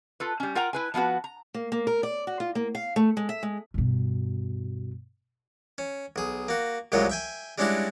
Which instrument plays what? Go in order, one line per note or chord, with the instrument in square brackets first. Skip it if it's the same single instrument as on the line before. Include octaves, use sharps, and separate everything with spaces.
[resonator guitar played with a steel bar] F4 A4 B4
G3 C#4
F4 A#4 F#5 G5 A#5
E4 B4 G#5
F3 B3 F4 F#4 B4
A#5
[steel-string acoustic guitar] A#3
A#3
A#4
D5
F#4
F4
A#3
F5
A3
G#3
E5
G#3
[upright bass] G2 B2
[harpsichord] C#4
B1 G#4
A#3 F#4
C2 F#2 A#2 F#3 G#3 C#5
E5 G5 G#5
G3 G#3 C#4 D4 E4 F#4